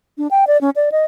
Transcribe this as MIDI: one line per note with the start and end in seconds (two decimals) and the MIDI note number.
0.18 0.28 62
0.31 0.45 79
0.47 0.60 74
0.61 0.70 61
0.76 0.89 74
0.92 1.05 75